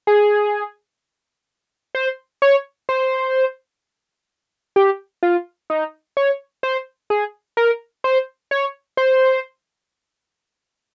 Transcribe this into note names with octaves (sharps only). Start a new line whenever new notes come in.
G#4
C5
C#5
C5
G4
F4
D#4
C#5
C5
G#4
A#4
C5
C#5
C5